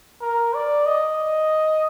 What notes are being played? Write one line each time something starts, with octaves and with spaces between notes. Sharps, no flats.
A#4
D5
D#5